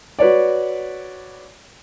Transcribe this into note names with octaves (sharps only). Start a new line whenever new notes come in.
F#4 B4 C#5 D5